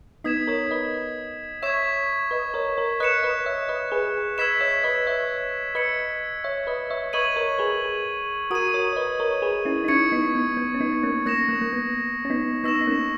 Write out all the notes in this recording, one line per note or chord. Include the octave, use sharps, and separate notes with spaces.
B3 D#4 D#6 G#6 B6 E7
A#4 C#5
B4 D#5
C#5 E5 C#6 G#6 B6 E7
B4 D#5
A#4 C#5
A#4 C#5
B4 D#5 F#6 C#7 E7
B4 D#5
C#5 E5
B4 D#5
G#4 B4
B4 D#5 E6 G#6 B6 E7
C#5 E5
B4 D#5
C#5 E5
B4 D#5 E6 G#6 C#7
C#5 E5
B4 D#5
C#5 E5
B4 D#5 C#6 G#6 D#7 F#7
A#4 C#5
G#4 B4
F#4 A#4 D#6 G#6 D#7
A#4 C#5
C#5
B4 D#5
A#4 C#5
G#4 B4
C#4 E4
D#4
C#4 E4 C#6 G#6 C#7
B3 D#4
B3
B3
C#4
B3 D#4
A#3 C#4
A#3 C#4 D#6 A#6 E7
A#3
A#3
B3
C#4
B3 D#4
B3 D#4 C#6 E6 A#6 E7
D#4
A#3 C#4